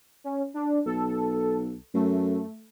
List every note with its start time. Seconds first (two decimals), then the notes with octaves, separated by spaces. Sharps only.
0.24 C#4
0.54 D4
0.86 B1 A4
1.94 F#2 A3